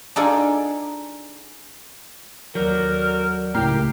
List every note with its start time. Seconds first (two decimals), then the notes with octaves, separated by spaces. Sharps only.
0.16 D4 D#4 F4 G#4 A4 D5
2.55 D#2 F#3 F#4 A4 A#4 D5 G6
3.55 C#2 A2 G4 A#4 C7